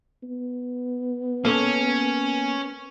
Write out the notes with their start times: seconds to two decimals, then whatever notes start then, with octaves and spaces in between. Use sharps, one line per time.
0.23 B3
1.45 A#3 C#4 A4 C#5